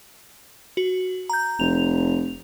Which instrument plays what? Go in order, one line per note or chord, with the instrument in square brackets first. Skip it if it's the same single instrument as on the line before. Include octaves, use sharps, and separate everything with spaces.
[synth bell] F#4
A#5 G6
[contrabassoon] F1 [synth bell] F7